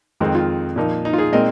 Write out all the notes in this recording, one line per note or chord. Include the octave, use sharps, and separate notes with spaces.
F2 D#3 G#3 C4 D#4
F4
A#2 F3 A#3 D#4
D#4
F4
D#4 G#4
A#2 G#3 C4 D#4 A#4 D#5